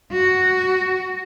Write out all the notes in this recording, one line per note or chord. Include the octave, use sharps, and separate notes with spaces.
F#4